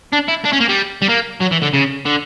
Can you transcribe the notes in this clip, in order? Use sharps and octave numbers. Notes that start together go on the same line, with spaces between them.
D4
E4
D4
C#4
A#3
G3
G3
A#3
F#3
E3
D3
C#3
D3